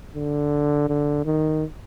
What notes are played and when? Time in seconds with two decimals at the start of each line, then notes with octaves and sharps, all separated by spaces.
0.15 D3
0.89 D3
1.25 D#3